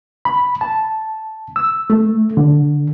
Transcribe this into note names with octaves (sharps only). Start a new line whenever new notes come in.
B5
A5
E6
A3
D3